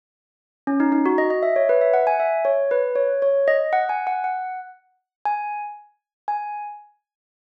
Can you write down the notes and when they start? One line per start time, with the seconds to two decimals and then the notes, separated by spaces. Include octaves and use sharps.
0.67 C#4
0.80 D#4
0.92 D#4
1.06 F#4
1.18 D#5
1.30 D#5
1.43 E5
1.56 C#5
1.69 B4
1.81 E5
1.94 F#5
2.07 G#5
2.20 E5
2.45 C#5
2.71 B4
2.95 C#5
3.22 C#5
3.48 D#5
3.73 F#5
3.89 G#5
4.07 F#5
4.24 F#5
5.25 G#5
6.28 G#5